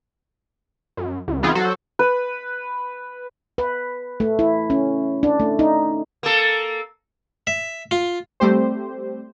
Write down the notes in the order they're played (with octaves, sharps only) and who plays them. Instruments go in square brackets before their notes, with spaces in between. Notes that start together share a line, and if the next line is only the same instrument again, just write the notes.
[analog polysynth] F#2
C#2
E3 B3 C4 D#4 F4 G#4
F#3 F#4 A4 C5
[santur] B4
[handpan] B4
A3
E4
C#4
D4
A3
D#4
[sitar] A#3 A4
[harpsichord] E5
F4
[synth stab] G3 A3 C4 G4 C5